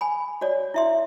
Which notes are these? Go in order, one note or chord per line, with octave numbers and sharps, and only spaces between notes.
G#5 B5
F#4 C#5 D5
E4 E5 C6